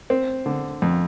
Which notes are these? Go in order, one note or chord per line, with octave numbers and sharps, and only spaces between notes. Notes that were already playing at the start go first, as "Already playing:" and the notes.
C4
D3
F2